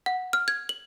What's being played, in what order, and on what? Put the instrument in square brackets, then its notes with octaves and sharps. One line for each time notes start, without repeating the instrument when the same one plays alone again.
[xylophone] F#5
F6
G#6
F#7